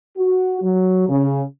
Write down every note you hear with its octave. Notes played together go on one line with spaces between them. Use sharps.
F#4
F#3
C#3